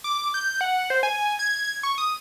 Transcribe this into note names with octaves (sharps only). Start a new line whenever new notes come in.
D6
G6
F#5
C5
G#5
G#6
C#6
D#6